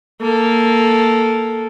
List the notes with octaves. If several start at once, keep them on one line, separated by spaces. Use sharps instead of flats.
A#3 A4